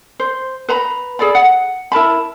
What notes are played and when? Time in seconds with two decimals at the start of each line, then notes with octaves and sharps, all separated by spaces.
0.20 C5
0.69 B4 A#5 B5
1.19 G#4 A4 D5 B5
1.35 F#5
1.92 E4 A#4 A5 B5